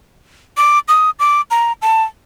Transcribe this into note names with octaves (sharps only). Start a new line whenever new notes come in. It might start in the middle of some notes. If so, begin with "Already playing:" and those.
D6
D#6
D6
A#5
A5